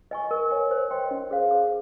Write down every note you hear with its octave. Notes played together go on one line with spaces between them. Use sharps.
D#5 G#5 C#6
A#4
C#5 G#5
C5
D#5 G5 C6
C#4
G#4 C5 F5
G#4